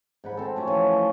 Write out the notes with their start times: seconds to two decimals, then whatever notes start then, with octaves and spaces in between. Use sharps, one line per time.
0.24 G#2 F#5 B5
0.37 C4 A4
0.56 F#3 A3 C#4
0.67 E3 F3 F4
0.87 D#5